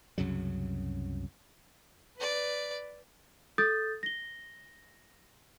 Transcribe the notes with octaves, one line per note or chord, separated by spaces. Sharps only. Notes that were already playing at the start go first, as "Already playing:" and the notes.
C2 F#2 C#3 F#3
B4 D5
A4 D#6 G6 A6
A#6 G7